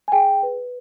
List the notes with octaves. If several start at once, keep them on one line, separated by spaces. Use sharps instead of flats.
G#5
G#4 G5
B4